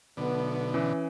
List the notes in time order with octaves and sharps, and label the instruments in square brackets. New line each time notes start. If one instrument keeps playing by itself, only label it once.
[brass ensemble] B1 A3 B3 [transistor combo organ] B2 D3
[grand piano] E3 [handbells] C#4